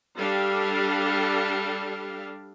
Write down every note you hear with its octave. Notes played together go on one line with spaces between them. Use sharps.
G3 D4 G4 A4 F5